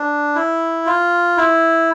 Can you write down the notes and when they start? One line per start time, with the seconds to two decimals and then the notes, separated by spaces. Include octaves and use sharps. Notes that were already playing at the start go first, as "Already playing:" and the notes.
Already playing: D4
0.35 E4
0.86 F4
1.37 E4